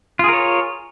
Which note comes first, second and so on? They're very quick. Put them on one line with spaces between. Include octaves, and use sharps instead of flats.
F4 G#4 A#4 C#5